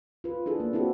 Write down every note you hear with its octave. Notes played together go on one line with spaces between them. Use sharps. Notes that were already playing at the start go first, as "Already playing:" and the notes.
F4 B4
D4 E4 G#4 A4
A#3
C4 D4 E4 F#4 G4 A4